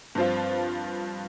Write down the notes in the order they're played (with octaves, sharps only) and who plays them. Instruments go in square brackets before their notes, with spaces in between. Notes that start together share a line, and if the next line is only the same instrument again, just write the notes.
[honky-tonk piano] G2 F3 C4 F4